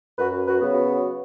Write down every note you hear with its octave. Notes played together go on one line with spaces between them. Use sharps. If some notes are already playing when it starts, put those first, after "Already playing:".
F#2 F#4 B4
F#4 B4
C#3 F#3 B3
F#4